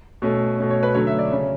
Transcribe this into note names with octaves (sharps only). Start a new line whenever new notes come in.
B2 A3 C#4
B2 A3 C#4
C#5
B4
D3 F#3 A3 C#4 C#5
E5
D5
C#3 F#3 C#4